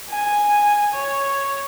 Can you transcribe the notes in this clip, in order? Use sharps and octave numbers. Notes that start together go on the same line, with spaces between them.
G#5
C#5